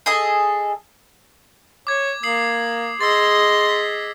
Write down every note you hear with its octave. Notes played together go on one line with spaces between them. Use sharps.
G#4 A4 D#5 G#5
C#5 D6 G#6
A#3 D#6 C7 F#7
G#4 D#5 C6 E6 A6
B6